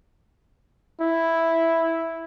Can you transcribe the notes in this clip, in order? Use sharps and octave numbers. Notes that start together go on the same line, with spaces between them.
E4